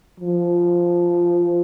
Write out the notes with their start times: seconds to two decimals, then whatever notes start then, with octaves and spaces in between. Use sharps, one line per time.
0.20 F3